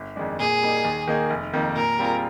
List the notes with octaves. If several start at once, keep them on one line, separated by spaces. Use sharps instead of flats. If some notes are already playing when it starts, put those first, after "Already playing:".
Already playing: G1
F2 D#3 G#3 D4
A#2 G#4
G3 A#3 D#4
D#2
D#3 A#3 D#4 G#4
F1
F2 D#3 A#3
A#2 A#4
G3 C4 F4 G#4